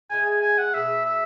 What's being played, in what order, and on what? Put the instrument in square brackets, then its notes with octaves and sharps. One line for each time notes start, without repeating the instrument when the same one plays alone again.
[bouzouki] G#3 E4 G#4 [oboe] G#5
[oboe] G#5
G#5
F#5
[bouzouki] B2 B3 G#4 [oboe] E5
[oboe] E5